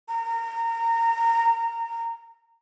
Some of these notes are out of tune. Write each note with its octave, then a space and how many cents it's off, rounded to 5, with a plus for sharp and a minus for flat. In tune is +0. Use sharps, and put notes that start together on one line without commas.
A#5 -25